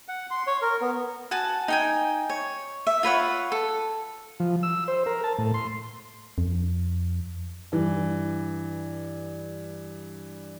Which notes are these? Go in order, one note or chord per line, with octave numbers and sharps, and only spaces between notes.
F#5
C6
C#5
A#4
B3
F#4 G#5 A5
D#4 G5 G#5
C#5
E5
F4 B4 C#5 F#5
A4
F3
E6
C5
A#4
A5
A2
C6
F2
G2 E3